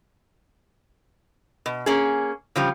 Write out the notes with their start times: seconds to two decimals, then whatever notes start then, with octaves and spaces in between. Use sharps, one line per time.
1.66 B2
1.86 A#3 C#4 G#4
2.56 C#3 F3 G3